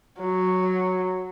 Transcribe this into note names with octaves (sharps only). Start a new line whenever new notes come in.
F#3